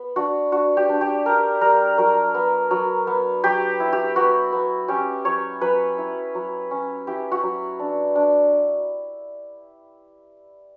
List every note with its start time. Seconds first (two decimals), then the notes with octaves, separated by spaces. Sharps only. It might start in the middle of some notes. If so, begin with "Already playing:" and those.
Already playing: B3
0.16 D4 F#4
0.52 D4 F#4
0.77 G4
0.89 D4
1.01 G4
1.26 D4 A#4
1.61 G3 A#4
1.98 F#3 A#4
2.35 B3
2.71 F#3
3.07 B3
3.44 F#3 G4
3.80 E4
3.93 G4
4.16 B3 F#4
4.53 B3
4.88 C#4 G4
5.25 F#3 C#5
5.61 F#3 B4
5.98 E4
6.35 F#3
6.71 C#4
7.07 E4 G4
7.32 F#4
7.43 F#3
7.79 D4
8.16 D4